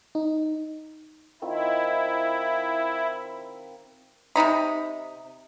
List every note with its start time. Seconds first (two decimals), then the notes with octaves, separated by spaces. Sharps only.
0.15 D#4
1.42 D#3 C4 E4 F4
4.36 C3 D#3 D#4 B5